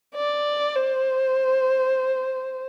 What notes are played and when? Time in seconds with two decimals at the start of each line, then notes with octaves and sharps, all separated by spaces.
0.16 D5
0.76 C5